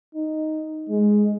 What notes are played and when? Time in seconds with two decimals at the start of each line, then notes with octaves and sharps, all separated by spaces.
0.15 D#4
0.89 G#3